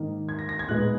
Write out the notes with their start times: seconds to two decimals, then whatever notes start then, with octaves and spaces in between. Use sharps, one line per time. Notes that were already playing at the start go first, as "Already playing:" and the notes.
Already playing: G#2 D#3 A#3 D#4
0.29 G#6
0.39 A#6
0.49 A#6
0.59 G#6
0.68 A#2 G#3 B3 D#4 F#6